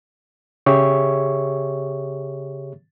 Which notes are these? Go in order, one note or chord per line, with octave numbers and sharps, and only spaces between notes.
C#3 G4 G#4 C#5 E5 C#6